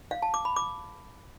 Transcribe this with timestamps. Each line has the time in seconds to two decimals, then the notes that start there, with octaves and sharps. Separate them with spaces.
0.11 F5
0.22 A5
0.34 D6
0.45 B5
0.56 D6